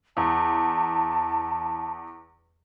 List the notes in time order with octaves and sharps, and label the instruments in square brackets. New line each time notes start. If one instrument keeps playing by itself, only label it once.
[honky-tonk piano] E2 [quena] A5